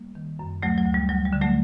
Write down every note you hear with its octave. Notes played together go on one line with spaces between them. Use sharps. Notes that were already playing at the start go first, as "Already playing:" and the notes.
Already playing: G3 A#3
D#3
F#2
D2 F#3 A3
F#3
D2
G3
D2 F#3
G3
D3
F#3 A3